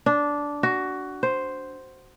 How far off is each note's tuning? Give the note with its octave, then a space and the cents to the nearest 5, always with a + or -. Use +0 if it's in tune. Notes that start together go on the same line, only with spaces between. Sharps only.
D4 -10
F#4 +15
C5 +0